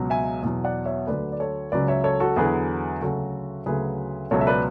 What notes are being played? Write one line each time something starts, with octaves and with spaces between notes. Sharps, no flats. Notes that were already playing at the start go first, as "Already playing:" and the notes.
Already playing: C#2 B2 F#3
E5 G#5
E2 B2 F#3
D5 F#5
C#5 E5
D2 D3 F#3 B4 D5
D5
A4 C#5
C#2 C#3 F#3 B4 D5
C#5 E5
A4 C#5
F#4 A4
E2 D3 F#3 G#4 B4
D2 C#3 F#3 F#4 A4
D2 C#3 F#3 G#4 B4
C#2 B2 F#3 A4 C#5
E5
B4 D5